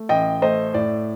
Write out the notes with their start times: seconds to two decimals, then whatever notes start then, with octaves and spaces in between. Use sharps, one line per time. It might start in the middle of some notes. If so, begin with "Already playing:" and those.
Already playing: A3
0.09 A1 D#5 G5
0.42 A3 C5 D#5
0.74 A2 D5